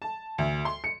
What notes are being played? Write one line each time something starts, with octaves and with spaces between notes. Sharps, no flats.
A5
D2
C6
C#7